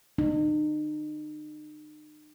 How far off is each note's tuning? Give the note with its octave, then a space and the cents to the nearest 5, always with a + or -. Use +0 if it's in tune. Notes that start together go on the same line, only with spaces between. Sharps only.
D#4 -40